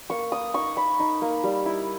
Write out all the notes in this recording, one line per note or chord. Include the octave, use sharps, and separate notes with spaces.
A#3 C#6
A#3 D#6
D#4 C#6
D#4 B5
D#4
A#3
G3
E4